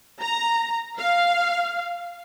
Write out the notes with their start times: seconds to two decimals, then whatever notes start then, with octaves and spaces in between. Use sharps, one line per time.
0.20 A#5
0.98 F5